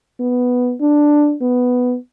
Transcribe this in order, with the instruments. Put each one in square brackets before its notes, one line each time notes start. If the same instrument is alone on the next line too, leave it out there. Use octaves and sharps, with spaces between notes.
[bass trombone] B3
D4
B3